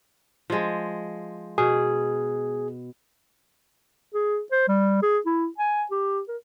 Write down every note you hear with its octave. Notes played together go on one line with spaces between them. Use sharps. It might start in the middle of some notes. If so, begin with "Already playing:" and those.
F3 G#3
B2 G#4
G#4
C5
G3
G#4
E4
G#5
G4
A#4